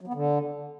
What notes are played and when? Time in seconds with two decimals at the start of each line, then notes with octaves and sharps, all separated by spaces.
0.01 F#3
0.07 B3
0.14 D3